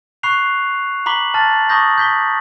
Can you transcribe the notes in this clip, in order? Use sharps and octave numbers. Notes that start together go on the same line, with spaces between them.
B5 C#6 F#6 C7 F7
A#5 B5 D6 B6 F#7 G7
A5 F6 A6
A5 B5 C#6 D#6 G6 A#6
G6 B6 G7